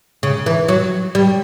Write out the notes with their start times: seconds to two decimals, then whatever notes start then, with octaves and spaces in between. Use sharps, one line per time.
0.23 C#3
0.46 E3
0.68 F#3
1.15 G3